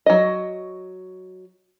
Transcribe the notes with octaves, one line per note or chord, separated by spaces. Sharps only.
F#3 D#5